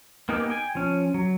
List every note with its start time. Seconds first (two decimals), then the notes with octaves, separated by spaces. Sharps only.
0.29 A#3 B3 D#4 G4 G#4
0.50 G5 G#5
0.75 F3 C#4
1.14 F#3